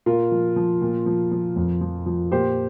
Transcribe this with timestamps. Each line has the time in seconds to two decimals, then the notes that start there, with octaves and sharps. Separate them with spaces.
0.06 A#2 F4 A#4
0.31 F3
0.56 F3
0.81 A#2
1.06 F3
1.31 F3
1.56 F2
1.81 F3
2.06 F3
2.32 A#2 G4 C5